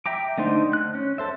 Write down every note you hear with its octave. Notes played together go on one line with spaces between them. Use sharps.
E5 G5 A#5 D6
D3 A3 D#4 C5
F#6
C#4
A4 C5 E5